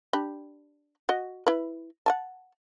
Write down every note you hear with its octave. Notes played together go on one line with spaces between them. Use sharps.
D4 G4 B5
F#4 D#5
E4 B4
F#5 G#5 A5